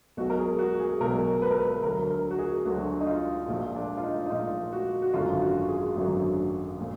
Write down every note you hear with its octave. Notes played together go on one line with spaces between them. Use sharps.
B1 B2 F#3 F#4
A#4
G#4
F#4
G#4
B1 B2 F#3 A#4
B4
A#4
B4
D2 D3 F#3 A#4
A#4
F#4
G#4
D2 D3 F#3 F#4
D#4
F4
A#1 A#2 F3
D4
F4
D#4
D#4
A#1 A#2 F3 F4
F#4
F#4
G#1 F#2 D3 F#3 F4
F#4
G#4
G#1 F#2 D3 F#3
A#2 F3